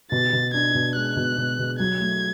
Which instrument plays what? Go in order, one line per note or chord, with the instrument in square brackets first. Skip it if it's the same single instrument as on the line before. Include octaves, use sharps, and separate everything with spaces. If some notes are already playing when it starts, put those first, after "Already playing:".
[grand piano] B2 [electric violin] A6
[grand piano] B2
[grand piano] D4 [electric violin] G#6
[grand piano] B2
[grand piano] G#3 [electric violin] F#6
[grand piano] B2
B2
B2
[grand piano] F#3 [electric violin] G#6
[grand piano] A3